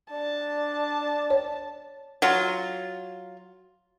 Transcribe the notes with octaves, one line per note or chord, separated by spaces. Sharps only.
D4 D5 A5
C#5
F#3 F4